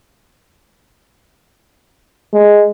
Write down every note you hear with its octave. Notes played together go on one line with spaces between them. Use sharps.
G#3